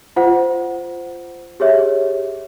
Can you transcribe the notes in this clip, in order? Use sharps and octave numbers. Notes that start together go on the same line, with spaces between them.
F4 C5 F#5
G4 G#4 C#5 E5